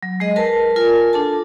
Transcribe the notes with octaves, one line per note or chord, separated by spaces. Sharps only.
F#3
G#3 G#4 D#5
A#4 B4 A5
F4 A#4 G#5
D4 A4 A5